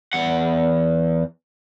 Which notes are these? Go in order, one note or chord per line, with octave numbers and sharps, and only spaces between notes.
E2 F#5